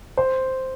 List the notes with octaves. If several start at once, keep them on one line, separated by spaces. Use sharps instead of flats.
C5